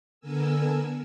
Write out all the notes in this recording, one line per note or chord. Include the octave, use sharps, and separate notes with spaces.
D3 B3 A4 A#4 G#5 E6